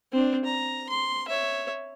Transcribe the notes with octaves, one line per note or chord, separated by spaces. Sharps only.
C4 D4
A#5
C6
C#5 E5